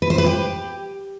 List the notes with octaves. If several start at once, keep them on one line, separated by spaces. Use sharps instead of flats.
B4
C5
B4
G4